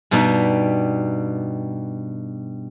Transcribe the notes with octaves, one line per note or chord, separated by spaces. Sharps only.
G2 B2 G3 B3 D#4